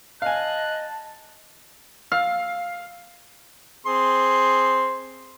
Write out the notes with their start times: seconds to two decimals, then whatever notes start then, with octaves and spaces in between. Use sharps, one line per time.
0.22 D#5 F5 G#5 A5 F#6
2.12 F5
3.86 C4 G#4 C6